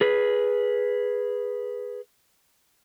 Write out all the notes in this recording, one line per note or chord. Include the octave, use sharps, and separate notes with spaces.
G#4 B4